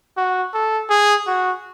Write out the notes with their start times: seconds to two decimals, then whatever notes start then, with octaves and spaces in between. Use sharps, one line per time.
0.17 F#4
0.54 A4
0.90 G#4
1.27 F#4